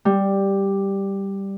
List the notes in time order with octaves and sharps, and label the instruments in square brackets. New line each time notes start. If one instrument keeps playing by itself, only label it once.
[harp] G3